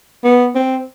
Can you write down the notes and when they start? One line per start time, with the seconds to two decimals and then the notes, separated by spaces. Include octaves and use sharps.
0.24 B3
0.55 C4